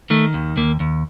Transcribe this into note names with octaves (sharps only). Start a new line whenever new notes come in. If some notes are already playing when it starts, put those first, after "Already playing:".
D#3 A3
D#2
D#2 A#3
D#2